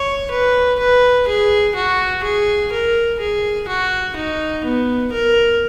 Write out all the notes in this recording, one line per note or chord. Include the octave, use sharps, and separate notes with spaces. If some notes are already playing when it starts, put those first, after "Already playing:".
Already playing: C#5
B4
B4
G#4
F#4
G#4
A#4
G#4
F#4
D#4
B3
A#4